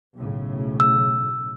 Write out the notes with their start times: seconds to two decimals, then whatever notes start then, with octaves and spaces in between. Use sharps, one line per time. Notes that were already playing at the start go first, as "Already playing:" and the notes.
0.15 B1 A2 C#3
0.80 E6